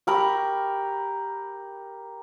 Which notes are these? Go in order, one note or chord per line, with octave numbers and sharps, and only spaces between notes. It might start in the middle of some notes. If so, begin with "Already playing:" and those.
G4 A#4 B5 C#6